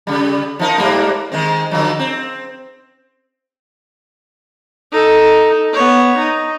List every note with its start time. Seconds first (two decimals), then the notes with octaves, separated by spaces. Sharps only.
0.07 C#3 G3
0.59 F3 D#4 A#4
0.78 G#2 G3 A#3
1.32 D#3 G#3 C4
1.71 D3 F3 F#3
1.99 C4
4.92 D#4 A4
5.73 B3 C#5
6.18 D#4